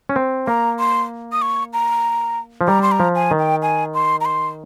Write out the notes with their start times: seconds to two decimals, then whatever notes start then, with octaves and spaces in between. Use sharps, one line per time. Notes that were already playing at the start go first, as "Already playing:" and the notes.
0.09 C#4
0.16 C4
0.47 A#3 A#5
0.79 C6
1.32 D#6
1.42 C#6
1.73 A#5
2.61 F3
2.68 G3 A#5
2.82 C6
2.92 A#5
3.00 F3
3.15 G#5
3.31 D#3
3.39 G5
3.62 G#5
3.94 C6
4.21 A#5
4.25 C6